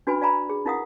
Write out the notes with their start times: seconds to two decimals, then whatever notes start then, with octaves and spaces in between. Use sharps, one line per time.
0.07 D4 F#4 B4 G#5 B5
0.21 D5 F5 G#5 A#5 B5
0.49 G#4
0.65 D#4 E4 A#4 F5 F#5 D#6